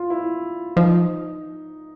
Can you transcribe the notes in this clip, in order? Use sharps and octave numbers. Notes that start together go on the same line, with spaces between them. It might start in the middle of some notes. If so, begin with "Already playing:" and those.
Already playing: F4
E4
F3 D#4